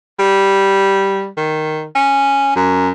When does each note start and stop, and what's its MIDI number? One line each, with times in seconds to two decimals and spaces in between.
0.19 1.28 55
1.37 1.84 51
1.95 2.55 61
2.56 2.90 42